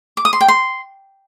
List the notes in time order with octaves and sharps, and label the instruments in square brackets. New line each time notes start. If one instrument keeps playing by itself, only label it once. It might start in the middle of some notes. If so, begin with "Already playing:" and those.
[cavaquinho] D6
D#6
C6
G5
C6